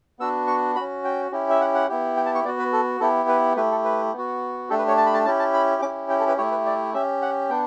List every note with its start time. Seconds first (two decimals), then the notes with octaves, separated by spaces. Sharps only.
0.19 B3 D4 F#4 E6
0.47 C#6
0.76 F#4 B5
0.80 C#4
1.05 G5
1.32 C#4 E4 G4
1.50 E5
1.60 F#5
1.74 F#5
1.89 B3 E4 G4
2.17 G5
2.26 A5
2.35 C#6
2.44 B3 D5
2.47 F#4
2.59 B4
2.73 A4
3.00 B3 E4 G4 A4
3.29 B4
3.56 A3 E4 G4 B4
3.71 A4
3.85 B4
4.13 B3
4.18 F#4
4.70 A3 D4 G4 A4
4.79 B4
4.88 C#5
4.97 A5
5.06 B5
5.14 A5
5.25 C#4 E4 G4 A5
5.39 A5
5.54 B5
5.82 C#4 E4 G4 D6
6.10 G5
6.19 A4
6.28 B4
6.37 A3 E4 G4 C#5
6.51 B4
6.66 D5
6.94 C#4 G4 E5
7.22 F#5
7.50 B3 D4 G5